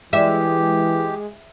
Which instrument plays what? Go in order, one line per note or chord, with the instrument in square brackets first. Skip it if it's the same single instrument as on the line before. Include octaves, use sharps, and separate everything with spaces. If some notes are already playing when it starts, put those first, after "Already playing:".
[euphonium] E3 [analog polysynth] G#3 [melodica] G4 [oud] E5